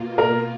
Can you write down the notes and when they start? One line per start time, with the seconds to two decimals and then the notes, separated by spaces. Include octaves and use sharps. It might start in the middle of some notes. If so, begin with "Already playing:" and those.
Already playing: B2 A#3 F4
0.18 A#4